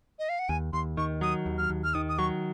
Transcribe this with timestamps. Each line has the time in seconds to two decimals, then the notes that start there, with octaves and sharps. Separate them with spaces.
0.19 D#5
0.29 F5
0.39 F#5
0.49 D#2 G#5
0.73 D#2 C6
0.97 D#3 C#6
1.21 F#3 D#6
1.46 D#2
1.58 F6
1.70 D#2
1.84 F6
1.94 D#3 D#6
2.09 D#6
2.18 F#3 C#6